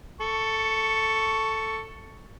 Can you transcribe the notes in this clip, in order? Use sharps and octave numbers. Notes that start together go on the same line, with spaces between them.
A4 C#6